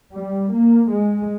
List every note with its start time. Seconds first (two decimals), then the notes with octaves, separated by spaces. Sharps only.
0.13 G3
0.52 A#3
0.91 G#3